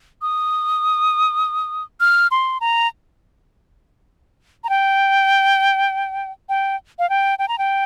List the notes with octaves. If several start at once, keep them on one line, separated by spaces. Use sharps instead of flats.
D#6
F6
C6
A#5
A#5
G5
G5
F5
G5
G5
A#5
G5